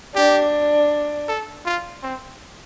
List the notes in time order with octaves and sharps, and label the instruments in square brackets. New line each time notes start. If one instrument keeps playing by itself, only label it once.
[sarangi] D4 [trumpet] G4
[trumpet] A4
F4
C4